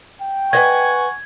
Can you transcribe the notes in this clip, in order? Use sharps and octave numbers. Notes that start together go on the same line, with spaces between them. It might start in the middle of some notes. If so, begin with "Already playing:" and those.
G5
B4 C5 D#5 F#5 G#5 C#6 G#6